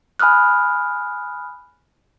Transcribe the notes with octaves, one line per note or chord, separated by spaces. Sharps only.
G#5 B5 D#6 F6 F#6